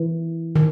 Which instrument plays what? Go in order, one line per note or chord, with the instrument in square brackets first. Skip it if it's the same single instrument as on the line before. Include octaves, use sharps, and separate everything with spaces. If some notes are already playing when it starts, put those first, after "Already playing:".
Already playing: [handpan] E3
D#3